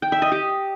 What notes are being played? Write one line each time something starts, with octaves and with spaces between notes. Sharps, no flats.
G5
E5
D#5
G4